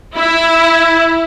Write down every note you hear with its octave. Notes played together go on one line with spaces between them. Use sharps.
E4